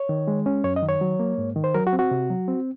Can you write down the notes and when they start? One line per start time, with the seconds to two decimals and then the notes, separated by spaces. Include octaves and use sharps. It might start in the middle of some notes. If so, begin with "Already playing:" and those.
Already playing: C#5
0.09 D#3
0.28 G#3
0.46 C#4
0.64 F#2 C#5
0.76 D#5
0.82 D#3
0.89 C#5
1.01 F#3
1.20 A#3
1.38 G#2
1.56 D#3
1.64 C5
1.74 F#3 A#4
1.87 F#4
1.93 C4
1.99 F#4
2.11 C3
2.30 F#3
2.48 C4